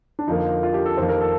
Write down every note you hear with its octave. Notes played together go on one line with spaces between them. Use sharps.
D4
F2 D3 F3 A#3 D#4
F4
G4
A4
F2 D#3 A#3 C5
A#4
A4